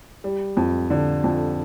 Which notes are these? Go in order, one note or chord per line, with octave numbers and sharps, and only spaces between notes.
G3
F2
D3
F2